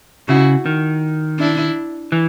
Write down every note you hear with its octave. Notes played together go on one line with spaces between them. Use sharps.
C#3 E4 F#4
D#3
D4 E4
E3